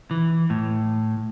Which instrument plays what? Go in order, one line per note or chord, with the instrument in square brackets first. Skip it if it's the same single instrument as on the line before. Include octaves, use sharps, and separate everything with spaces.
[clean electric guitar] E3
A2